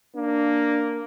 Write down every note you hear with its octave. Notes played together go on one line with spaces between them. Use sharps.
A#3 D4